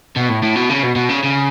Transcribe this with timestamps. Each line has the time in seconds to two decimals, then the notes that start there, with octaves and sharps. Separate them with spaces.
0.17 B2
0.29 A2
0.43 A2
0.56 B2
0.70 C#3
0.83 B2
0.96 B2
1.09 C#3
1.23 C#3